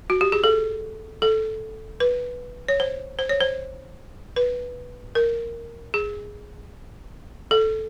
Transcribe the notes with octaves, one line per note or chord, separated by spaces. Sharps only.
F#4
G4
G#4
A4
A4
B4
C#5
C5
C5
C#5
C5
B4
A#4
G#4
A4